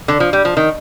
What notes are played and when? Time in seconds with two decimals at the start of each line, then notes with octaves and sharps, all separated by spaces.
0.08 D3
0.20 F3
0.33 G3
0.45 F3
0.57 D#3